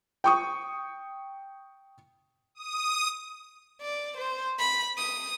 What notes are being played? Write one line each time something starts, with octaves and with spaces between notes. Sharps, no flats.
G5 C#6 D#6
D#6
D5
C5
B5
D#6